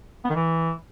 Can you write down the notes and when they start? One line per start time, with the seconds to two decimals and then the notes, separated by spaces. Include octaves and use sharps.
0.24 B3
0.30 D#3
0.35 E3